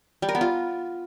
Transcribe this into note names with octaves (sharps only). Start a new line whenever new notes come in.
G3
A#4
B3
F4